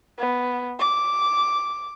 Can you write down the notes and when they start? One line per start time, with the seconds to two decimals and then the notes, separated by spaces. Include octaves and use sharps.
0.19 B3
0.79 D6